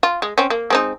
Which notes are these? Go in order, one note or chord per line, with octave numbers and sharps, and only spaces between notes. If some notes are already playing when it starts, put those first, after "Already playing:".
F4
G#3
C4 C#4
A#3
G#3 C4 D#4